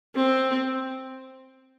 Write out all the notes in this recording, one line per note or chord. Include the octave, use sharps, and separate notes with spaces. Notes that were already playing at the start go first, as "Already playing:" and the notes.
C4